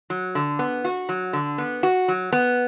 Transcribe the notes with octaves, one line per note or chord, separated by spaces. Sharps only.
F#3
D3
B3
F#4
F#3
D3
B3
F#4
F#3
B3